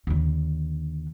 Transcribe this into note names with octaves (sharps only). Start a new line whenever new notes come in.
D#2 D3